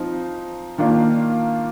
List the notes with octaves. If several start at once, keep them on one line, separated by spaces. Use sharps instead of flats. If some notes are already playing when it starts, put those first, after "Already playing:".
Already playing: F3 C4 D#4
D#3 A#3 D4 F4